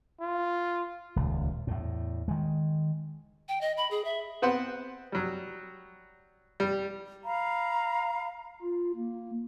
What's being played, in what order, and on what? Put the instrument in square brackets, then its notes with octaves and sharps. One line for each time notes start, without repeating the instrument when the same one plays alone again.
[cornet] F4
[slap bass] D#1 C#2
E2 A2
D#3 G#3
[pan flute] G5
D#5
B5
G#4
E5
[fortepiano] B3 C4 B4 C5 F#5
F#3 G3
G3
[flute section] F5 A#5 B5
[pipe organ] F4
A#3